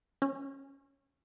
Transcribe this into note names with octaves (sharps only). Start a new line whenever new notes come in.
C#4